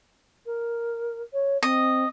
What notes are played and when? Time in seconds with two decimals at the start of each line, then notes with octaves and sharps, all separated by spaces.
0.46 A#4
1.33 C#5
1.63 C4 D#5